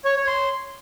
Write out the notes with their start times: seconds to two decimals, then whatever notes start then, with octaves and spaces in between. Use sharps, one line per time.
0.05 C#5
0.16 C#5
0.27 C6